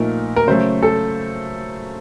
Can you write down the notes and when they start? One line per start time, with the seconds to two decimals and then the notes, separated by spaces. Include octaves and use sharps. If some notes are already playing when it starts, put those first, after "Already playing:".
Already playing: A#2 F3 A3 D#4 A#4
0.36 A#4
0.47 C#3 F#3 A3 C5
0.83 A4